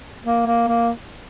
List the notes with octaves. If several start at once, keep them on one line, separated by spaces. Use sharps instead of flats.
A#3
A#3
A#3